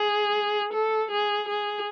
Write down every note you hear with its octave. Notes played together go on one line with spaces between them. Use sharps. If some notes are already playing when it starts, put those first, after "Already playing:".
Already playing: G#4
A4
G#4
G#4